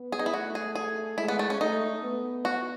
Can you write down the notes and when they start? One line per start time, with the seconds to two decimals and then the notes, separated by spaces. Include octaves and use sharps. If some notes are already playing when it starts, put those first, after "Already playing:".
Already playing: B3
0.12 G#4
0.19 D#4
0.26 E4
0.33 A3 F#4
0.55 G#4
0.75 G#4
1.18 G#3 E4
1.28 B3
1.39 A3
1.50 C#4
1.61 A3 D#4
2.03 B3
2.45 F#4